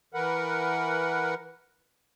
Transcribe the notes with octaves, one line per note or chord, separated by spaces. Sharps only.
E3 A#4 B4 F#5